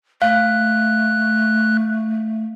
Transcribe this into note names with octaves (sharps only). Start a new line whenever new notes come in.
A3 F5 F#6